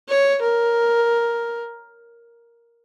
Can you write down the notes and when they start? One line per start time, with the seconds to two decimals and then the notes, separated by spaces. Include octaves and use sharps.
0.08 C#5
0.42 A#4